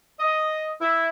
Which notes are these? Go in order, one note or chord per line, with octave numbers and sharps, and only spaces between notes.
D#5
E4